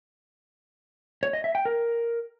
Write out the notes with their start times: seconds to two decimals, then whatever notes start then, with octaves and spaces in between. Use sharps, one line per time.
1.23 C#5
1.33 D#5
1.44 E5
1.55 G5
1.65 A#4